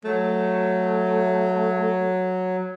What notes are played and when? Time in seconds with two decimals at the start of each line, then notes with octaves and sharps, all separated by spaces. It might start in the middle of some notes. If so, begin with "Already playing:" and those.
0.05 F#3 A3